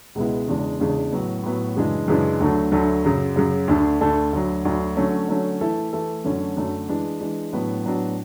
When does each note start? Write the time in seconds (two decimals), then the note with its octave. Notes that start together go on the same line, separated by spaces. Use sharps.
0.15 C#2 B2 G#3 B3 E4
0.48 E2 C#3 G#3 D4
0.79 E2 C#3 G#3 D4
1.12 A2 F#3 B3
1.43 A2 F#3 B3
1.76 F#2 C#3 E3 G#3 D4
2.08 F#2 C#3 E3 G#3 D4
2.40 D2 D3 F#3 A3
2.72 D2 D3 F#3 A3
3.05 F#2 C#3 F#3
3.36 F#2 C#3 F#3
3.68 D2 D3 A3 D4 A4
4.00 D2 D3 A3 D4 A4
4.33 D2 D3 F#3
4.65 D2 D3 F#3
4.97 D3 F#3 A3 C#4
5.29 D3 F#3 A3 C#4
5.61 E3 A3 E4 A4
5.93 E3 A3 E4 A4
6.24 F#2 D3 F#3 A3 C#4
6.57 F#2 D3 F#3 A3 C#4
6.89 E3 G#3 D4
7.20 E3 G#3 D4
7.53 A2 F#3 B3 D4
7.85 A2 F#3 B3 D4